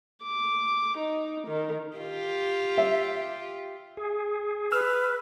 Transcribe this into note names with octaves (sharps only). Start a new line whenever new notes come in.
D6
D#4
D#3
F4 G4
E5
G#4
B4 E6 F6